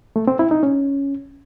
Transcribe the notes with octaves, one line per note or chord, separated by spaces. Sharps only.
A3
C4
E4
D#4
C#4